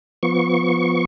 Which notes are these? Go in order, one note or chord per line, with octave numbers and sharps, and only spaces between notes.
F3 B3 C#6